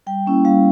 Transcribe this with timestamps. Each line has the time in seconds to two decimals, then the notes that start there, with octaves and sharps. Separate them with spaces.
0.07 G3 G5
0.27 A#3 C#4 E4
0.45 G3 F5